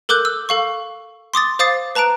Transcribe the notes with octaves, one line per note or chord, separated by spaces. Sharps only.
A4 A#4 D6 F#6 G6
E6
A4 F5 C#6
C6 D6 D#6 A6
C5 F5 D6 D#6 A6 C7
B4 A5 A#5 F#6 D7